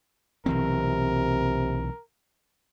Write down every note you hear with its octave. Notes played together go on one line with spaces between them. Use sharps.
B1 C3 E3 C4 A#4